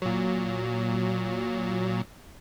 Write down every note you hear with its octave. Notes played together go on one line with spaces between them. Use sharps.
A#2 F#3